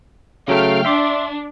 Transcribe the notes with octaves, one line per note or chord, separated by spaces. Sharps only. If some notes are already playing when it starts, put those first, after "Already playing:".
C#3 F#3 A3 F5 G5 F6
D4 E5 C6 D6